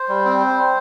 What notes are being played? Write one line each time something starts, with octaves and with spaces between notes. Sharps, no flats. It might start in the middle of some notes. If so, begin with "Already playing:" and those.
Already playing: C5
G3
C4